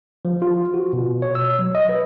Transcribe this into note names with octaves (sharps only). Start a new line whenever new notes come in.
F3
F4
F#4
B2
C#5
E6
F#3
D#5
B4